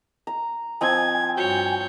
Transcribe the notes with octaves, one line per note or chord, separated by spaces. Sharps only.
A#5
F3 C4 D#5 G5 G#5 G#6
G2 F#4 C#5 G6